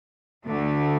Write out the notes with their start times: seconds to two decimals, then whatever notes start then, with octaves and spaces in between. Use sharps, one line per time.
0.45 D2 D3 A3